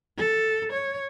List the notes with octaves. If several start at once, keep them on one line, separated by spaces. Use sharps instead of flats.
A4
C#5